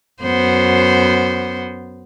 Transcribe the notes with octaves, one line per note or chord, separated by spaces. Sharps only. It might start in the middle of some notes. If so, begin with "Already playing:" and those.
F#2 B3 C5